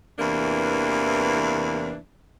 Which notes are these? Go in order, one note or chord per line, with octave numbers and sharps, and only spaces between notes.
E2 C3 E3 A#3 D4